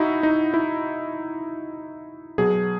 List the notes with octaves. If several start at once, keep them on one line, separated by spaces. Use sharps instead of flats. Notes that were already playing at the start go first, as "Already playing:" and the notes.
Already playing: D#4 E4 F#4
D#4
E4
B2 F#3 G#4